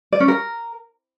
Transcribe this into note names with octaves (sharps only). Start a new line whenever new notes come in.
D5
C#4
A#4